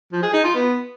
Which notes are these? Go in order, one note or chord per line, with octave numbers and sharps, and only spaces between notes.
F3
G#4
D#4
F4
B3